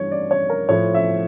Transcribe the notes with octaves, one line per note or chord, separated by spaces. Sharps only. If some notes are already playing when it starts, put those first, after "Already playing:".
Already playing: G2 E3 G3 C#5
D5
C#5
A#4
A2 F3 C#5
E5